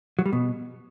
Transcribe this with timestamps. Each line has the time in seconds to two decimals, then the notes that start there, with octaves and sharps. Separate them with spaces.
0.19 F#3
0.26 G3
0.33 B2